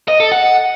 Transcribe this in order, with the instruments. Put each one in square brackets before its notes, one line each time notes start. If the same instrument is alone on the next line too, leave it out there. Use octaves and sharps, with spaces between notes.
[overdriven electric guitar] D#5
A4
F#5